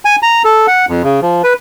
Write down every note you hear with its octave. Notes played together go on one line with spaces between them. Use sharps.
G#5
A#5
A4
F#5
F2
C#3
F3
B4